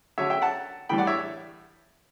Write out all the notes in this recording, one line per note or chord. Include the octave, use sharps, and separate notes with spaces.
D3 F#3 C#4 C#5 E5
E5 G5
F#5 A5
A2 E3 G3 G5 B5
D5 F#5
C#5 E5